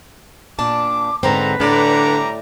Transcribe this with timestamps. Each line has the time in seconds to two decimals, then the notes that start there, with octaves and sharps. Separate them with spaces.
0.59 A#2 D4 A5 D6
1.23 G#2 D3 C4 A4 B4 A#5
1.60 A2 D3 G3 D5 A#5 D6